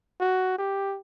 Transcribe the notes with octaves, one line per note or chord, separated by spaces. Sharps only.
F#4
G4